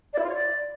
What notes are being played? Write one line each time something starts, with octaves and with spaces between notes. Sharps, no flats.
D5
E4
F4
C#5
D5